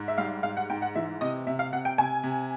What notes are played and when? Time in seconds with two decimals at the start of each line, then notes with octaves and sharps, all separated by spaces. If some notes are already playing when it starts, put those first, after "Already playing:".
Already playing: G#2
0.08 E5
0.18 G3 F5
0.43 G#2 F5
0.57 F#5
0.70 G#2 G5
0.82 F#5
0.95 E3 E5
1.21 C3 D#5
1.47 C3 E5
1.59 F5
1.72 C3 F#5
1.85 G5
1.98 C3 G#5
2.23 C3